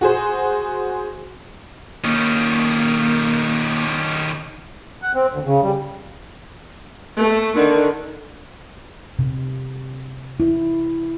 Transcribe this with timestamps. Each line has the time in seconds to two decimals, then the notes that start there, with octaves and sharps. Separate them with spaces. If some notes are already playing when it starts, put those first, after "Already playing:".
0.01 F#4 G#4 C5
2.04 D#3 A#3 C#4
5.02 F#5
5.15 C4
5.31 D2
5.45 C#3
5.62 G3
7.16 A3
7.55 D3 D#3
9.19 C3
10.40 E4